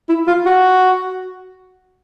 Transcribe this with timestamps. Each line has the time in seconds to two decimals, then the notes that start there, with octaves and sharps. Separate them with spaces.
0.09 E4
0.27 F4
0.46 F#4